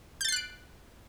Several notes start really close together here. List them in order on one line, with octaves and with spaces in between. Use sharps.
G6 A6 C7 F#6 D7